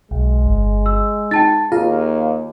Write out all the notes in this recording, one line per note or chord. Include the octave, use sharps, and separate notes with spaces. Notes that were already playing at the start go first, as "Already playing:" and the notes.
B1 G#3
G1
E6
D#4 G5 A5 A6
D#2 F4 G#4 F5